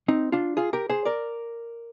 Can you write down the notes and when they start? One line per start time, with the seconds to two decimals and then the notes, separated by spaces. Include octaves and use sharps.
0.08 C4 D#4
0.32 D4 F4
0.57 F4 G#4
0.73 G4 A#4
0.89 G#4 C5
1.05 A#4 D5